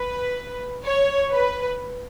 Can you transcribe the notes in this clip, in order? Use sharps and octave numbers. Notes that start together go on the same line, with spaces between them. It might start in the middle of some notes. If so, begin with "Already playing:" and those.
Already playing: B4
C#5
B4